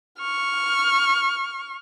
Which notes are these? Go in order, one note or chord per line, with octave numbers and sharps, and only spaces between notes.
C#6 F6